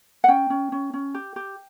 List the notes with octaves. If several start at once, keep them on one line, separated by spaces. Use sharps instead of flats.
F#5
C#4 G5
C#4
C#4
C#4
G4
G4